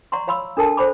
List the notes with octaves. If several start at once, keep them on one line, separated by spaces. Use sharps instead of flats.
D5 F#5 A#5 C6 C#6
C#5 F5 B5 C6 E6
D4 A4 A#4 A5
A4 C5 D5 B5 D6